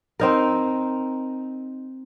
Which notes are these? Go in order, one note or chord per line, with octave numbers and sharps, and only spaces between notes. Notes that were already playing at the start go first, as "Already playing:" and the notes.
C4 D#4 A#4